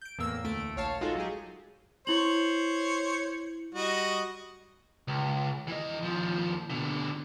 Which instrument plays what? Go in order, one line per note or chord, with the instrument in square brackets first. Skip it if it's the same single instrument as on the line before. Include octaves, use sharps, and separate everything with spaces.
[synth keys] G6 D7
E2 A2 A#3 E6
D2 A3 D7
A#1 C#5 F5 A5
G#3 D#4 F4 F#4 G#4 A4
F#3 G#3 G4 G#4
[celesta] E4 F#7 [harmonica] C5 C#5
[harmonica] G3 F#4 D#5
[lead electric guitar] C#2
E3 D#5
D#2 F3
B2 D3